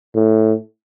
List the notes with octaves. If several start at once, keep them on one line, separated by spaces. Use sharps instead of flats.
A2